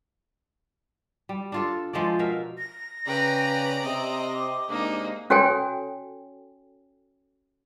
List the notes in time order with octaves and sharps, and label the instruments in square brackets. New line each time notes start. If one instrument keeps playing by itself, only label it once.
[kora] G3
D4 F4 A4
F3 G#3 A3 D5
B2 A#4 E5 F5
[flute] A#6
[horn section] C#3 [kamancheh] B4 G5 [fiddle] D5 A#5
[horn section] C3 C4 [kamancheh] D#5
[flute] D6
[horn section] C3 G#3 D4 [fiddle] A#3 D#4
[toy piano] C#4 F#4 A4 C#5 G5 G#5